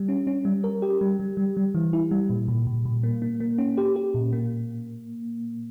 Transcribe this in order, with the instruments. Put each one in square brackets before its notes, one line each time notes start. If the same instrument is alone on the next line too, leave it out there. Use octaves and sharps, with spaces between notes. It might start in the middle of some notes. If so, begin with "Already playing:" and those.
Already playing: [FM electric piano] G3
C#4
C#4
G3
A#4
G4
G3
G3
G3
G3
E3
E4
G3
A#2
A#2
A#2
A#2
A#3
A#3
A#3
C#4
G4
G4
A#2
A#3